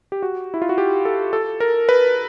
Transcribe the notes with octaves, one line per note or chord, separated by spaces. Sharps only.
G4
F#4
E4
F4
F#4
G4
A4
A4
A#4
B4